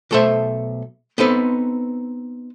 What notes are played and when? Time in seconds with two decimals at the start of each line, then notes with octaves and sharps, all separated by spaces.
0.11 B1 A3 A4 C5 E5
1.18 B3 C4 D#4 A4 B4